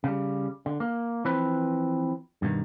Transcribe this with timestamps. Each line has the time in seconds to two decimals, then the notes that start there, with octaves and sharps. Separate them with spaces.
0.04 C#3 G3
0.66 D3
0.80 A#3
1.25 E3 F3 C4 B4
2.42 G2 B2 D3 D#3